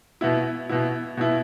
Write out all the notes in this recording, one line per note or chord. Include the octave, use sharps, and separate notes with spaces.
B2 B3 E4
B2 B3 E4
B2 B3 E4